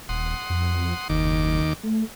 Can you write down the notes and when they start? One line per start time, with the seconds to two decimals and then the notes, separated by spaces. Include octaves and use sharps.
0.09 D#1 F#5 C6 D#6
0.50 F2
1.09 F#1 D#2 D#3 D6
1.83 A3